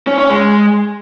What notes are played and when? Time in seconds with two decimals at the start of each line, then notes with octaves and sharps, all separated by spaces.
0.07 C#4
0.18 C#4
0.30 G#3